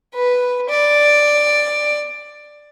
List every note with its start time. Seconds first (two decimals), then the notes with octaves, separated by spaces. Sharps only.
0.15 B4
0.69 D5